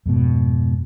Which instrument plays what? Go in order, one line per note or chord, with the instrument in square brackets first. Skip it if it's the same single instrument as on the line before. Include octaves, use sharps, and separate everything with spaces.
[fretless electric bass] F2 G#2 B2